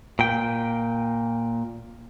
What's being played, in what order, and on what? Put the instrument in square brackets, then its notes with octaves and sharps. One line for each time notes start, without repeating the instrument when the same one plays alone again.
[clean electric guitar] A#2 G5